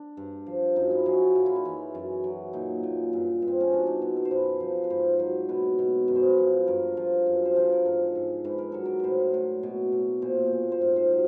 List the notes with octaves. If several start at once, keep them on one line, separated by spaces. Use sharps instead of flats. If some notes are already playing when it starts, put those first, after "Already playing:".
Already playing: D4
G2
F3
F#2 D#4
E4
F#3 G#4
F#2 F4
E4
D#4
E3 E4
F#2
F#3
A#2 D#4
A#2
G2
G2
C4
C#4
B2 D4
D#4
B2 F#4
A4
C5
F#2 B4
F3
B4
G#2 C5
F#3
B2 B4
B2
F#2 B4
C5
B4
F3
G2 A#4
F3
F#2
C5
F3 B4
A#4
G#2 A4
G#2
G#2 B4
A#4
F#3 A4
A#4
A2 B4 C5
A2
B2
B2
A#2 C5
C5
A#2
C5
G#2
C5
F#3